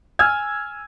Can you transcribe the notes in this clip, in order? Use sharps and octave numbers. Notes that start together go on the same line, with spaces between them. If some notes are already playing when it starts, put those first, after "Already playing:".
G#5 E6 F6 G#6